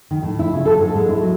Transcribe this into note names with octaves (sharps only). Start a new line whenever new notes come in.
D#3
A2
E4
C#3
A4
G#2
G#3
E4
F#3